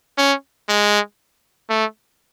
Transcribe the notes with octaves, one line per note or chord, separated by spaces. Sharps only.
C#4
G#3
A3